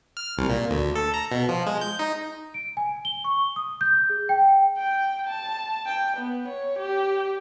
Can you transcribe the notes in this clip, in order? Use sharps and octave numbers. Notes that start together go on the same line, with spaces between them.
F6
C2
A#2
D2
A4
A#5
B2
F3
G#3
G6
D#4
D7
G#5
G7
C#6
D#6
G6
G#4
G5
G5
A5
G5
B3
C#5
G4